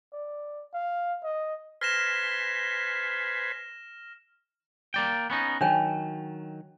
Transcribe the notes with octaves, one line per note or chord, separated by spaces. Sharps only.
D5
F5
D#5
B4 C5 G#5 F6 A#6 E7
A#3 D5 G5
B3 C#4 D#4
D#3 F#3 D4 C#5 G5